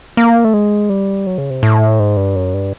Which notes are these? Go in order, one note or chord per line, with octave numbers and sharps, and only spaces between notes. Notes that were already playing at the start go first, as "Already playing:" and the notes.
A#3
A3
G#3
G3
F#3
C#3
C3
A2
G#2
G2
F#2
G2